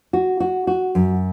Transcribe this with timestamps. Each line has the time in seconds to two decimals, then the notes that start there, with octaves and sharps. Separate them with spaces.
0.13 F#4
0.40 F#4
0.67 F#4
0.95 F#2